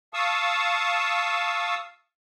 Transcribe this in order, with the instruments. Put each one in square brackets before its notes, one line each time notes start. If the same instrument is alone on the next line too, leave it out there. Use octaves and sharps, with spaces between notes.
[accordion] F5 A5 C#6 D#6 E6